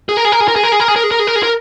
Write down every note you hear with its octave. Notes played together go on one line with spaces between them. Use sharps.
G#4
A#4
G#4
A#4
G#4
A#4
G#4
A#4
G#4
A#4
G#4
A#4
G#4
A#4
G#4
A#4
G#4
A#4